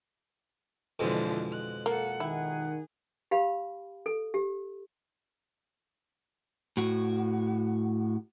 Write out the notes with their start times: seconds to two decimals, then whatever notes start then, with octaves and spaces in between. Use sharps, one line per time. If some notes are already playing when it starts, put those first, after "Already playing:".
0.99 F2 B2 D3 E3 F3 G#3
1.50 F#6
1.86 A#3 A4 F#5
2.20 D#3 E4 G#4 F#5
3.31 G4 F5 B5
4.06 A4
4.34 G4
6.77 A2 F#4